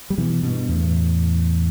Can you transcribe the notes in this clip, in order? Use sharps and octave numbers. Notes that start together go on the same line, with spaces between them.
G3
B2 E3
G2 B2
E2 A2